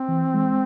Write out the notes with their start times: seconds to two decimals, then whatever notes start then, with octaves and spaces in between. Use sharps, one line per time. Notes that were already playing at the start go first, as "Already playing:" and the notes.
Already playing: C4
0.08 E3
0.34 G#3